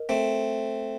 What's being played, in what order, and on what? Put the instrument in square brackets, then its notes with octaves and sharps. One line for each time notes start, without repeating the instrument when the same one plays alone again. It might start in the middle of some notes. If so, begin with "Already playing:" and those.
Already playing: [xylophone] A#4 D#5
[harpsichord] A3 C4